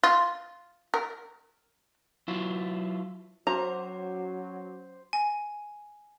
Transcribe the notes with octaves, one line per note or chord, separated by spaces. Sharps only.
F4
A#4
F#3 E4 F4
F#3 C#4 F#4 C5 A#5 D6
G#5